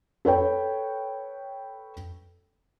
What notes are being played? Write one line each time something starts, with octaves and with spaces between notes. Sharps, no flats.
A4 B4 C#5 G5